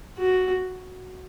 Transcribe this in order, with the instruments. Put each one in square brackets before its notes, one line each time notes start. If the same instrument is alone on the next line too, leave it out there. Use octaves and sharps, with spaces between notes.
[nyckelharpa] F#4